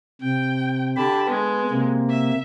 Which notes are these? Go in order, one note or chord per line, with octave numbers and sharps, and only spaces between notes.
C3 G5
D3 G4 A5 B5
G#3 B3
C3 A#3
E5